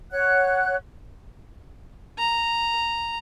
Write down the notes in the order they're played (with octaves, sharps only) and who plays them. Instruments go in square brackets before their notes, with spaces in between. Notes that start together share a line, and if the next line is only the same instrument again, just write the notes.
[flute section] C#5 F#5 F#6
[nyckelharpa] A#5